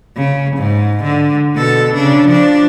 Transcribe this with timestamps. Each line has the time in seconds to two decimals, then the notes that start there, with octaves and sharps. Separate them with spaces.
0.17 C#3
0.57 G#2
1.04 D3
1.55 B2 A4
1.94 C#3 D4
2.27 F3 D4